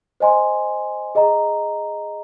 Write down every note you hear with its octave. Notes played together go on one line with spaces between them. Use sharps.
C5 D#5 G#5 C6
G#4 D#5 A#5